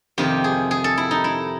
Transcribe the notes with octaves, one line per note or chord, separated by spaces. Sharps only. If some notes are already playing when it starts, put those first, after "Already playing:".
F2 C3 D#3 G4
G#4
G#4
A4
E4
D#4
E4